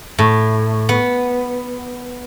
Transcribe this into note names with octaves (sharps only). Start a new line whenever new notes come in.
A2
B3